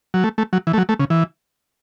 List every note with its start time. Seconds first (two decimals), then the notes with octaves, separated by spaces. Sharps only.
0.14 F#3
0.24 A3
0.38 A3
0.53 F#3
0.67 E3
0.73 A3
0.78 F#3
0.89 A3
1.00 C#3
1.10 E3